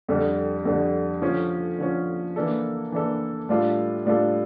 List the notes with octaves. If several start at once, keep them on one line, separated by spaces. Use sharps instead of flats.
F2 D3 G3
F2 D3 G3
D3 F3 C#4
D3 F3 C#4
E3 A#3 D4 A4
E3 A#3 D4 A4
A2 G3 D4 F4 A4
A2 G3 D4 F4 A4